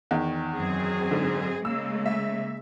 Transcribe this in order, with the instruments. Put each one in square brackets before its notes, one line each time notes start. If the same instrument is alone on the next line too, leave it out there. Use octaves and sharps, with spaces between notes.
[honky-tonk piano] E2 D#3
[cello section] F#2 C4 G#4
[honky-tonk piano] G#2 D3
[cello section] C#3 G#3 A#3 [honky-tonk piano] E6
[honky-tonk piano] E5